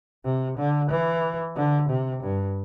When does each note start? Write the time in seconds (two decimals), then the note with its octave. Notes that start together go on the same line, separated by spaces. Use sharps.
0.25 C3
0.58 D3
0.90 E3
1.56 D3
1.89 C3
2.23 G2